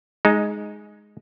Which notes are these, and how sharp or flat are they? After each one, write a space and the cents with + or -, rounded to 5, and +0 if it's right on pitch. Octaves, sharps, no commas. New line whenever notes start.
G#3 +5 D#4 -5